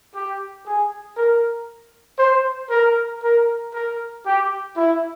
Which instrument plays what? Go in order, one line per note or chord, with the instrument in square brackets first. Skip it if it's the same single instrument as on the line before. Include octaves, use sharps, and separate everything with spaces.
[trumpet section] G4
G#4
A#4
C5
A#4
A#4
A#4
G4
E4